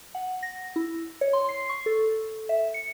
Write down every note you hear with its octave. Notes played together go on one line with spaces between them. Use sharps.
F#5
A#6
E4
C#5
C6
C7
C#6
A4
E5
C#7